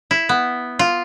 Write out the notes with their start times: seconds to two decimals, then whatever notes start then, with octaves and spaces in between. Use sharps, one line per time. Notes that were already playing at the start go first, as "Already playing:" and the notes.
0.11 E4
0.29 B3
0.79 F4